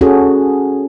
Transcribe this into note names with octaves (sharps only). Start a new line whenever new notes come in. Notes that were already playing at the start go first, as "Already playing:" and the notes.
C#4 F#4 G#4 A4